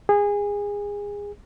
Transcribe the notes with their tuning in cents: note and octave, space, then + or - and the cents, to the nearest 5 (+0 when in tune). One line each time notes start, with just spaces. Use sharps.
G#4 -25